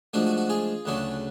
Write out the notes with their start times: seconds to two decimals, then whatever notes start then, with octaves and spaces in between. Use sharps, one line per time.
0.13 G#2 F3 A3 D4 F#4
0.26 F#4
0.37 F#4
0.49 F4 G#4
0.85 D2 C#3 F#3 A3 D4